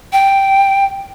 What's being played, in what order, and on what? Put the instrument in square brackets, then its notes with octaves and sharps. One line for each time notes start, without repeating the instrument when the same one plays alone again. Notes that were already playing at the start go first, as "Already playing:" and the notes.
[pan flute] G5